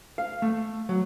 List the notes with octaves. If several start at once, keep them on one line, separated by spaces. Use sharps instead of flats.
F5
A3
F#3